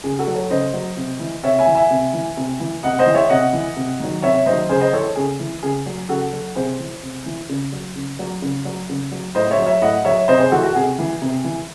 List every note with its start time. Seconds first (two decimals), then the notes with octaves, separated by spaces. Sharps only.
0.04 C#3 G#4
0.19 F#4 A4
0.27 F#3
0.34 A4 C#5
0.50 C#3 C5 D#5
0.73 F#3
0.97 C3
1.20 E3
1.43 C3 C#5 E5
1.59 E5 G#5
1.67 E3
1.75 E5 G#5
1.90 C3
2.13 E3
2.37 C3
2.60 E3
2.83 C3 D#5 F#5
2.99 C5 D#5
3.06 E3
3.14 C#5 E5
3.29 C3 D#5 F#5
3.53 E3
3.76 C3
4.00 D#3 F#3
4.22 C3 C#5 E5
4.46 D#3 F#3 C5 D#5
4.69 C#3 G#4 C5
4.81 C5 D#5
4.92 E3 A4 C#5
5.16 C#3 G#4
5.40 E3
5.63 C#3 G#4
5.86 F#3
6.09 C#3 F#4 A4
6.33 F#3
6.55 C3 G#4 C5
6.79 E3
7.03 C3
7.26 E3
7.49 C#3
7.72 F#3
7.95 C#3
8.19 F#3
8.42 C#3
8.65 F#3
8.89 C#3
9.12 F#3
9.35 A2 C5 D#5
9.51 C#5 E5
9.59 F#3
9.66 C#5 E5
9.82 A2 D#5 F#5
10.05 F#3 C#5 E5
10.28 C3 C5 D#5
10.39 G#4 C5
10.52 E3 F#4 A4
10.63 F#4
10.75 C3 G#4
10.99 E3
11.22 C3
11.44 E3